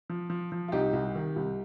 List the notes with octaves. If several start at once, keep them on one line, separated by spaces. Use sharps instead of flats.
F3
F3
F3
F4
C2 D#4 G4
C2
D#3
C2